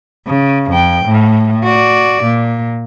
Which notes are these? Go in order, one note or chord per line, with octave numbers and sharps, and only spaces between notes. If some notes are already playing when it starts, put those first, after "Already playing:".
C#3
F2 G5
A2
F#4 D5
A#2